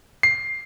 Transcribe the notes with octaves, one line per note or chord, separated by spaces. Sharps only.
C7